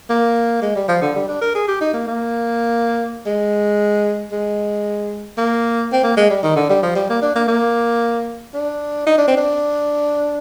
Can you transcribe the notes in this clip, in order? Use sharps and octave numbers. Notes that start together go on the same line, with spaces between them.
A#3
G#3
G3
F3
D3
G3
D4
A#4
G#4
G4
D#4
A#3
A#3
G#3
G#3
A#3
C4
A#3
G#3
G3
D#3
D3
G3
F3
G3
A#3
D4
A#3
A#3
D4
D#4
D4
C4
D4